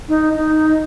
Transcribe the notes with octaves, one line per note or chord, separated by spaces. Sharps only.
D#4
D#4